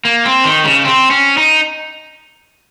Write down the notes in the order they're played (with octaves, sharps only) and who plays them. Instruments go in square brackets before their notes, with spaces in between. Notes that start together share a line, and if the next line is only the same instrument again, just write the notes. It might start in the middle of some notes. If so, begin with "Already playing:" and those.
[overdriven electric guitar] A#3
C4
D#3
C#3
C4
C#4
D#4